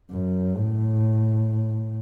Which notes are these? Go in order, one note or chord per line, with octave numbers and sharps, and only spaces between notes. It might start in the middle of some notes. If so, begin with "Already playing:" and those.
F#2
A2